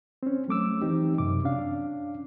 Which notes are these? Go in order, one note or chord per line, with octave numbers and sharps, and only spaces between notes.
C4 C#4
F#3 A3 D6 E6
E3 C4 D#4 G4
F#2 C3 D6
C#4 D4 F5